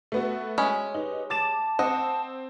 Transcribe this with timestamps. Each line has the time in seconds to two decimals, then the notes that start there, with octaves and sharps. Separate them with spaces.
0.12 A3 B3 F#4
0.58 G#3 C#4 B5
0.94 D#4 G4 B4
1.30 A5 D6 A6 E7
1.79 C4 D#5 F#5